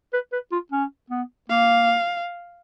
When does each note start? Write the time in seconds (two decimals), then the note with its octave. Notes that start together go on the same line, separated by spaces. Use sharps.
0.13 B4
0.33 B4
0.52 F4
0.72 C#4
1.10 B3
1.50 A#3 F5